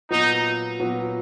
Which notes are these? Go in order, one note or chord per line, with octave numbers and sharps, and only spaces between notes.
A#2 F#3 B3 D#4
A#2 F#3 B3